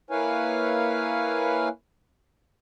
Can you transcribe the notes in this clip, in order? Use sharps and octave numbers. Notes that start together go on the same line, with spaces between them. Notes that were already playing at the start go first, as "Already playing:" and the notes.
A#3 E4 B4 C#5 F5 G#5